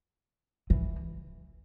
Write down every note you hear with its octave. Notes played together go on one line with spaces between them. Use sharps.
E3